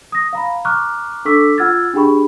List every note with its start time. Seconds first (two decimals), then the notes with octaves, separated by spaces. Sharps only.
0.12 D#6 A#6
0.33 F5 A#5 B5
0.65 A#5 C#6 D6 F6 F#6
1.25 D4 A4 C#6 D6 E6 B6
1.58 F4 F#5 E6 F6 G#6 A6
1.93 D4 G4 G#4 G5 B5 C#6